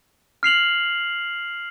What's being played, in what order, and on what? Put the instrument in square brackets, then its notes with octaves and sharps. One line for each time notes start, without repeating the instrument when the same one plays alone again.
[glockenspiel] F6 C7 F7 F#7